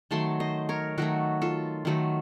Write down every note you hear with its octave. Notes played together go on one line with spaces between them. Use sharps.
D#3 F#3 A3 A5 C6
C5 D#5
A#4 C#5
D#3 F#3 A3 F#4
F4 A4
D#3 F#3 A3